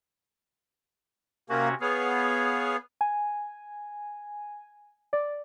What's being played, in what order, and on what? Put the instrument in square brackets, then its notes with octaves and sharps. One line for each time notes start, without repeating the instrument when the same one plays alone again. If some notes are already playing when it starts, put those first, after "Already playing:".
[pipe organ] C3 C#4 F#4 [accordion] A#3
[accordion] B3 [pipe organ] G#4 C#5 F5
[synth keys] G#5
D5